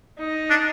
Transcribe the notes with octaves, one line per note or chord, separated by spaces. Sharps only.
D#4
D4